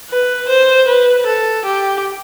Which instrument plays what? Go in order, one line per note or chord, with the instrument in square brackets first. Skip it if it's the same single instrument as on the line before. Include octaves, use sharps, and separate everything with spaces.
[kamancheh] B4
C5
B4
A4
G4